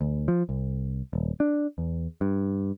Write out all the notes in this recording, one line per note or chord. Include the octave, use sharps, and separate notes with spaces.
D2
F3
C2
D#1
D4
E2
G2